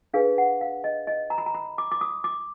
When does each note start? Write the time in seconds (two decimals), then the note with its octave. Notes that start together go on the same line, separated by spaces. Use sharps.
0.14 D4 G#4 B4 F5
0.38 F#5
0.61 F5
0.84 D#5
1.07 D#5
1.30 A#5
1.38 B5
1.46 A#5
1.54 B5
1.78 D6
1.92 D6
2.01 D#6
2.24 D6